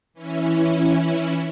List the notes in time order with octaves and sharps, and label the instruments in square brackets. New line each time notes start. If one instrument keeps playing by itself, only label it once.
[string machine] E3 C#4 E4